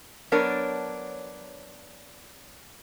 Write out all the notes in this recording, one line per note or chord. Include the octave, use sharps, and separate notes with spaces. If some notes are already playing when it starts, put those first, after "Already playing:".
F#3 B3 D4 A#4 C#5